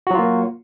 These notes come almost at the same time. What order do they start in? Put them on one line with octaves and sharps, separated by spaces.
F#4 F#3 F4 A#3